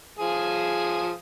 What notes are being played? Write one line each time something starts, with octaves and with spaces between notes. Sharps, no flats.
F3 G#4 D#6